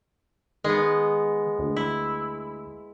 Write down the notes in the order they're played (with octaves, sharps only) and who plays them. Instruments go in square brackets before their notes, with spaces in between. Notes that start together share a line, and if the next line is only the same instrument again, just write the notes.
[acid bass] D#3 [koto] G#3 B3
[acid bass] D2
[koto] E4